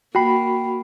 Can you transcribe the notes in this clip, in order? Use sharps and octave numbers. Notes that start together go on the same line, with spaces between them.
A#3 F#4 G5 B5 C7